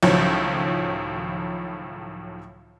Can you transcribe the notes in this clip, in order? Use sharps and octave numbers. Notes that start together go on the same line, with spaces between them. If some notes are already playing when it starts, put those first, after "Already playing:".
C#2 A2 D#3 F3 F#3